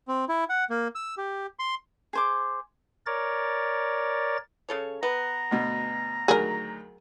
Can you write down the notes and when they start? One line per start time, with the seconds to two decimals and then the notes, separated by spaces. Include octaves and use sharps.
0.08 C4
0.29 E4
0.50 F#5
0.70 A#3
0.95 E6
1.18 G4
1.59 C6
2.13 G#4 C5 D6
3.06 A#4 C#5 D5 A6
4.69 C#3 A4 C#5
5.03 B3 A#5
5.51 D2 B2
6.28 D2 D#3 F#3 G#4 A#4